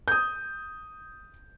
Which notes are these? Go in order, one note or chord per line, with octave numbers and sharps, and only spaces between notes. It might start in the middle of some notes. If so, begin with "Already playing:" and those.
D#6 G6